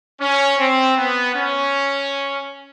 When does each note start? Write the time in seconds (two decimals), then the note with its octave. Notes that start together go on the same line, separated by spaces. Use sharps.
0.20 C#4
0.58 C4
0.97 B3
1.34 C#4